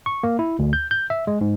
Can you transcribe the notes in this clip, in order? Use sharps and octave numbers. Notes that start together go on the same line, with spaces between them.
C#6
A#3
E4
D2
G6
G6
E5
G#3
G#2